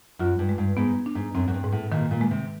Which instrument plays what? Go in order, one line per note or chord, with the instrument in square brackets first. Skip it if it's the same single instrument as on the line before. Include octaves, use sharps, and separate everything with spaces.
[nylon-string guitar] F#2 [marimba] F4
[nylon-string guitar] G2
[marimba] G#3
[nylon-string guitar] G2
[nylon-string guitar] G#2 [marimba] B3
[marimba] D4
[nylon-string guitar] G#2
[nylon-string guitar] F#2 [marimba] C4
[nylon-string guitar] F#2
G2
[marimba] G#2
[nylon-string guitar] A2
[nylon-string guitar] A#2 [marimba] D#3
[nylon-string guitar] A#2
[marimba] G#3
[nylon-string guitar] C3